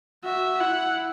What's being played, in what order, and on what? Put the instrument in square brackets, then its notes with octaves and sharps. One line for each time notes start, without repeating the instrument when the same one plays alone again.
[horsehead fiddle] F#4 [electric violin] E5
[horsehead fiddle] E4 [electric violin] F#5